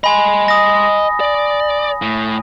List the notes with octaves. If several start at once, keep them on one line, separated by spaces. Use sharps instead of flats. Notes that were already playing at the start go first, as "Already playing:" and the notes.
D#5 G#5 B5 C6
D#6 A#6
D5
A2